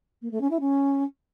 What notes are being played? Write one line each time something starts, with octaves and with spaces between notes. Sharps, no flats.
A#3
A3
C#4
E4
C#4